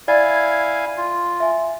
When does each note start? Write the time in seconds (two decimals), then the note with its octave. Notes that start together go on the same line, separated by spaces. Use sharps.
0.08 E4 D5 F5 G#5 G#6 A6
0.97 F4
1.40 E5 G#5